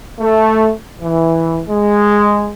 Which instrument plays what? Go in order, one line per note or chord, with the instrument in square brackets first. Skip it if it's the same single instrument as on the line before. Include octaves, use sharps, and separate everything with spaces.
[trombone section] A3
E3
G#3